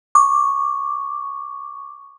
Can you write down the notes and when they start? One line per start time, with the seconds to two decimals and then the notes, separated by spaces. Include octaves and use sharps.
0.15 C#6 D6